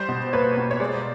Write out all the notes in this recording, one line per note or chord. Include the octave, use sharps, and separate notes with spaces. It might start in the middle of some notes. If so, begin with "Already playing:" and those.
Already playing: G3 C5
B2
A#3 B4 C#5
B2
C#5
G#3 C5 D5